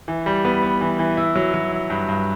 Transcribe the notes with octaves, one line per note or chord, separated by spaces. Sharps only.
E3
G3
B3
B3
E3
E3
E4
F#3
F#3
E4
G2
G2